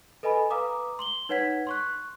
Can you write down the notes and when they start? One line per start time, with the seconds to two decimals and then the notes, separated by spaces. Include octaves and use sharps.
0.23 A4 B4 D#5 G#5 B5
0.50 B4 F5 A#5 D6 D#6
0.99 C6 F#7 G7
1.29 D#4 B4 C#5 F#5 G#6 B6
1.67 C6 C#6 F#6